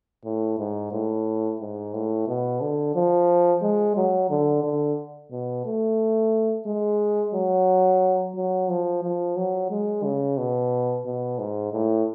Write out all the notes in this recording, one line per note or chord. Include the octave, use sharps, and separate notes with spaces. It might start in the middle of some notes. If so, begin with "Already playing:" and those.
A2
G#2
A2
G#2
A2
B2
D3
F3
G#3
F#3
D3
D3
B2
A3
G#3
F#3
F#3
F3
F3
F#3
G#3
C#3
B2
B2
G#2
A2